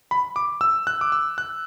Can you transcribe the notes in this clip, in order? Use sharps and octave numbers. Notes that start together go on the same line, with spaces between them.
B5
D6
E6
F#6
D6
E6
F#6